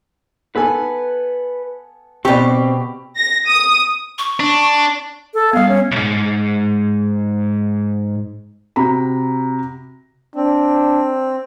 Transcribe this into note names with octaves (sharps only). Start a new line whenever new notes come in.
B3 A4 B4 G#5
B2 C4 G4 D5 C#6
A#6
D#6
C#6
D4
A4
G3 B3 F5
C#4
C2 G#2
C3 F#4 A#5 B5
C4 D4